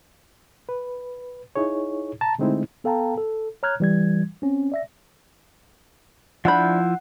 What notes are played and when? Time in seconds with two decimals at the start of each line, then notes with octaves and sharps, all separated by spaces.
0.69 B4
1.56 D#4 E4 G#4 C#5
2.21 A5 A#5
2.39 D3 G#3 A3 C4 D#4 E4
2.84 B3 A4 F5 G5 A5 A#5
3.18 A4
3.63 C#5 A#5 F6 F#6 G#6
3.80 E3 G3 G#6
4.42 C4 C#4
4.72 D5 E5 A#6
6.45 F3 D4 E4 F#5 B5 G6